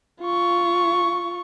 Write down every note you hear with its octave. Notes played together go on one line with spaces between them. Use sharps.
F4 C#6